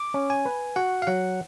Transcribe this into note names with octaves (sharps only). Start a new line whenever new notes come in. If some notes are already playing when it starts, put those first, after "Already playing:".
Already playing: D6
C#4
G#5
B4
F#4 F#5
F5
F#3 F#5